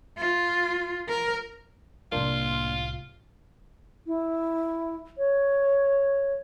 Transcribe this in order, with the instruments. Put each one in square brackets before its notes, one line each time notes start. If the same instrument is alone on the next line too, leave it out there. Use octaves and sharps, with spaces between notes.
[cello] F4
A#4
[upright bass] C2 A2 [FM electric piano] A#3 D4 C6 [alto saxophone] F4
[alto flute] E4
C#5